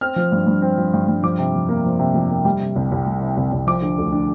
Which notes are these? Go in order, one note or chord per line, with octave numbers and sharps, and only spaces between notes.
C4 F6
F3
G2
G2
C4
F3
G2
G2
F3 D6
C3
F2
A#3
F3
C3
F2
A#3
G3
C3
C2
C2
G3
C3
C2
C2
F3 D6
D3
D2
D4